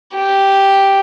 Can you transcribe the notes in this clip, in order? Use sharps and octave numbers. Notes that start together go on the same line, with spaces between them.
G4